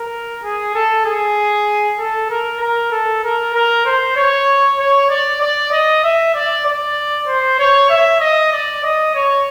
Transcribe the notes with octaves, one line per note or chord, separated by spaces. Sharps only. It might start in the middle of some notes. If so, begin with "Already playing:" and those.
Already playing: A#4
G#4
A4
G#4
A4
A#4
A#4
A4
A#4
A#4
C5
C#5
C#5
D5
D5
D#5
E5
D5
D5
C5
C#5
E5
D#5
D5
D#5
C#5